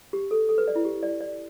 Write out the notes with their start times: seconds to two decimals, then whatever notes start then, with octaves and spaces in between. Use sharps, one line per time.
0.13 G4
0.31 A4
0.49 A4
0.58 B4
0.68 D5
0.76 E4
0.85 G4
1.03 D5
1.20 D5